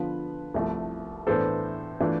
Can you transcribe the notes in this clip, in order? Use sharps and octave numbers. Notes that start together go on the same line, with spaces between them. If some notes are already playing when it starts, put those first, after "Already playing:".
Already playing: D3 F3 B3 F4 B4
C2 C3 F3 A3 E4
A2 E3 B3 D4 A4 C5
E3 A3 D4 F4